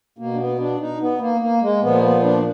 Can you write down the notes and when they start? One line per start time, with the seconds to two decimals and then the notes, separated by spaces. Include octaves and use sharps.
0.18 B2 A#3
0.34 D4
0.39 B3
0.60 D4
0.80 D#4
1.01 B3
1.21 A#3
1.41 A#3
1.62 G#3
1.82 A#2 F3 B3
1.94 A#3
2.03 B3
2.23 D4